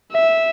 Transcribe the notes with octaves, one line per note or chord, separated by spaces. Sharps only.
E5